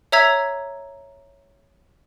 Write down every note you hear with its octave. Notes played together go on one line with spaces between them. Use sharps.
C#5 E5 A#5 E6 G#6 B6